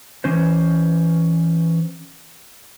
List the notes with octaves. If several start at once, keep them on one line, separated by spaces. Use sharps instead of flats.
E3 C#4 C5